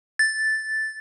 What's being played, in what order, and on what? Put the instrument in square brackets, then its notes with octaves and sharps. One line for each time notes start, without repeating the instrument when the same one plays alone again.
[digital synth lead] A6